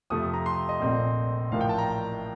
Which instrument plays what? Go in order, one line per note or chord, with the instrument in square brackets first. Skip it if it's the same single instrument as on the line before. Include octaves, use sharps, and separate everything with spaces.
[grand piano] F2 C3 F3 A3 D#6
A#5
C6
D#5
A#1 A#2 A3 C4
A1 A2 F3 A#3 F5
G5
A5
A#5